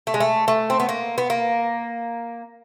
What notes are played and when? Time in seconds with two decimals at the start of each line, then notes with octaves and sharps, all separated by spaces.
0.07 A3
0.14 G#3
0.20 A3
0.48 A3
0.70 C4
0.80 B3
0.89 A#3
1.18 B3
1.30 A#3